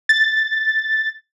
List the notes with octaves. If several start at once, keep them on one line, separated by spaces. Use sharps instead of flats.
A6